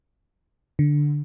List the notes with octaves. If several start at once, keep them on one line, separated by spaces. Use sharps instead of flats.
D3